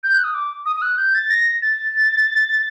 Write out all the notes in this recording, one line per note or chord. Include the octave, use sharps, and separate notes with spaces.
G6
F#6
D#6
D6
D#6
D#6
F#6
G6
A6
A#6
A6